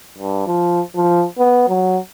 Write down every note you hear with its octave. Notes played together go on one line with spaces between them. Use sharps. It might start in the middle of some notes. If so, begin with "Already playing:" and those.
G2
F3
F3
B3
F#3